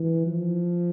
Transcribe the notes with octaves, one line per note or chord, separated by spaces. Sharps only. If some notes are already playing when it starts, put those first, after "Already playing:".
Already playing: E3
F3